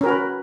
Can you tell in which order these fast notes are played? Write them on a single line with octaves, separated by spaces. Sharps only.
C#4 A#4 F#4 B4